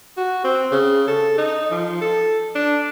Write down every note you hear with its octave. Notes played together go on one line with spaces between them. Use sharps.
F#4
C4
C#3
A4
D#4
F3
A4
D4